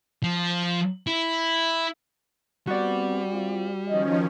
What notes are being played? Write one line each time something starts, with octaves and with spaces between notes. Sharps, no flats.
F3
E4
G3 B3 C4 F#4 D5
C4 F4
D#3 F3 C#4 D#5